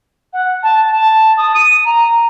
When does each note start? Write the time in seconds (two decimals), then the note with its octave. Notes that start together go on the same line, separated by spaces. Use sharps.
0.33 F#5
0.63 A5
0.90 A5
1.37 D#6
1.55 D#7
1.85 A#5